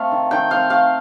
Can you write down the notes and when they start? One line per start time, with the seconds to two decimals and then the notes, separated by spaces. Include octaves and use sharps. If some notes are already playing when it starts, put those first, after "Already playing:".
Already playing: A3 C4 F5
0.12 D#3
0.31 D#3 G5
0.51 C4 F5
0.70 A3 F5